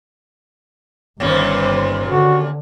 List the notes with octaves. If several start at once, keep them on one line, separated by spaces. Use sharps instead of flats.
G1 D#2 A#2 C#4 B4 C5
D3 F#4